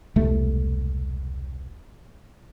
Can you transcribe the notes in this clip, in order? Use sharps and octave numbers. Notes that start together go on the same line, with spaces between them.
E1 C2 A3